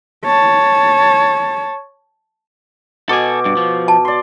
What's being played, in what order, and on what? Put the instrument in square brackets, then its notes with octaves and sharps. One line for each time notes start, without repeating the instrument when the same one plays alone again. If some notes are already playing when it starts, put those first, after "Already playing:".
[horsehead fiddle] C#5 A5
[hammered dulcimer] B2 D6 [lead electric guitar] A4 G#5
[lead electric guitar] G2
F3
[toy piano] A5
[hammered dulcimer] D5 C6